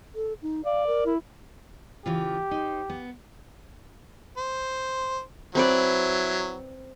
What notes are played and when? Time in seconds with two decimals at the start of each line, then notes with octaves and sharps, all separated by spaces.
0.15 A4
0.42 D#4
0.65 D5 F5
0.87 A#4
1.06 E4
2.06 C#3 E3 F4 G4
2.51 D#4 C5
2.90 B3
4.37 C5
5.55 F#3 C4 E4 B4 D5